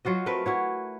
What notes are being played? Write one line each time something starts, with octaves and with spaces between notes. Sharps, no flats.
F#3 F4 F#4 D#5
A3 C4 A#4 B4
E4 F#4 C#5